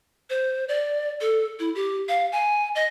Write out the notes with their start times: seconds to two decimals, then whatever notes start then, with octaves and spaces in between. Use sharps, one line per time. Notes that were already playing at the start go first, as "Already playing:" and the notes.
0.30 C5
0.69 D5
1.21 A4
1.60 E4
1.75 G4
2.09 F5
2.32 G#5
2.75 D#5